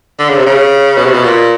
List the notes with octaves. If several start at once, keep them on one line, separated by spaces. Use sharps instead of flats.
D3
C#3
C3
C#3
B2
C3
B2
A#2